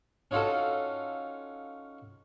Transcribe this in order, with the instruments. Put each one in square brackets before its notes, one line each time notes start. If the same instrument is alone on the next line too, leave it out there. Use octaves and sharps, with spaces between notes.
[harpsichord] C#4 D#4 F4 F#4 A4